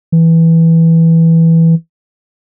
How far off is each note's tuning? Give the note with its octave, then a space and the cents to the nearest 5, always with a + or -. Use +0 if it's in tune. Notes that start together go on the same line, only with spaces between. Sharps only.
E3 -5